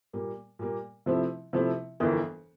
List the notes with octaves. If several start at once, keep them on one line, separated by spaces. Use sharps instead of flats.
A#2 G3 A#3
A#2 G3 A#3
C3 F3 A3 C4 E4
C3 F3 A3 C4 E4
G1 F2 E3 A#3